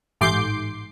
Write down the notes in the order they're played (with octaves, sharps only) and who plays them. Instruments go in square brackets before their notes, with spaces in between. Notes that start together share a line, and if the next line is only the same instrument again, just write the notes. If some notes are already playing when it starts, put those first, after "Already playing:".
[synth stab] A1 G#2 C6 D6 G6 C7